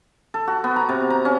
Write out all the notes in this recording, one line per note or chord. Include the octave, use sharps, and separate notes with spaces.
A4
F#4
B3
A#5
C3
A#5
C#4